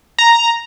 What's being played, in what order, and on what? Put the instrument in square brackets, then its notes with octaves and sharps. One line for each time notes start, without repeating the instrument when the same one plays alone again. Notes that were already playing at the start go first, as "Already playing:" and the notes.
[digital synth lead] A#5